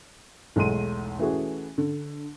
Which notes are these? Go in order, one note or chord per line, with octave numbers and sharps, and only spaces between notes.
B1 E2 G#3 A3 C6 D#7
E3 A3 C#4 F#4 G#4
D3